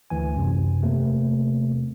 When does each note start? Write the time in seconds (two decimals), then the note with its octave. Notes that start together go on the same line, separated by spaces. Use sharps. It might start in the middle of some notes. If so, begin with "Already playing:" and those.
0.10 D2 E3 G#5
0.37 F#2 C3
0.82 E2 C3 A3 A#3